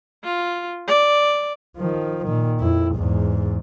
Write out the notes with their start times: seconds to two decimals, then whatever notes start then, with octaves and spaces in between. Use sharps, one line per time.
0.24 F4
0.87 D5
1.77 D#3 F3
2.26 A#2 D#3
2.60 F2 E4
2.96 E2 G#2